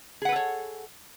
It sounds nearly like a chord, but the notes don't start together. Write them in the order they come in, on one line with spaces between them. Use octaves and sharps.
G#4 F#5 B4 A4 C#5